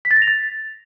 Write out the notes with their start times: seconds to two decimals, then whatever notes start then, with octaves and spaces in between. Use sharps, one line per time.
0.05 B6
0.11 A6
0.16 A#6
0.22 F7
0.28 A6